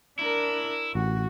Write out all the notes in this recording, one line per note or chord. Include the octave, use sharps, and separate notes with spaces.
D4 E4 A#4
A1 F#4